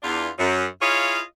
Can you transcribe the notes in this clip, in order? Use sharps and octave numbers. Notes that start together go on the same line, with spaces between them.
E2 D4 F4
F#2
E4 F4 G#4 C#5 D#5 F5